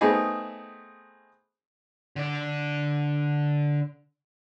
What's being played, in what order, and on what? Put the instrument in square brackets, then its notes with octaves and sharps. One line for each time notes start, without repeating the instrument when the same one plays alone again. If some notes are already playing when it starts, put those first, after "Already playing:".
[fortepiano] A3 B3 C4 D#4 G#4
[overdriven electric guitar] D3 D5